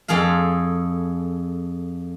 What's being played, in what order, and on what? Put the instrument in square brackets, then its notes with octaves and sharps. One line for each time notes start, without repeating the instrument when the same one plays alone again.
[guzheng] F2 G#4 A4 F5